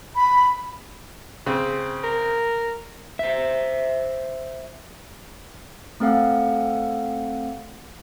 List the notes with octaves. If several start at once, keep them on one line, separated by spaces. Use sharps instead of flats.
B5
C#3 C4
A#4
C5 E5
A3 C4 A4 F5 F#5